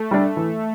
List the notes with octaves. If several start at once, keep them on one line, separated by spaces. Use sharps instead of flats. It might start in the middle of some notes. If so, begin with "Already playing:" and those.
Already playing: A3
G3 D4
E3